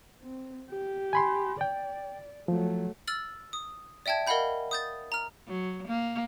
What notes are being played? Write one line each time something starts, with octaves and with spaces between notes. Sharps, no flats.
C4
G4
G#5 B5 C6
D5 G5
F3 F#3 A3
E6 F6 A6 F#7
D#6
D5 E5 G5 A5 G#6
A#4 D#5 F5 F#5 B5 G6
D#6 G6 A6
A#5 F6
F#3
A#3